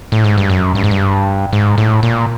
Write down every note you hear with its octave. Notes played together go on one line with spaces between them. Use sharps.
A2
G#2
G2
F#2
G2
G#2
G2
G#2
A2
A#2